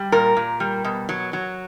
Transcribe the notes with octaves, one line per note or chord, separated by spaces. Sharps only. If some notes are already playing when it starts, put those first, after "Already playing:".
Already playing: G3
A#2 A#4
A#2
G3
B2
F#3
F#3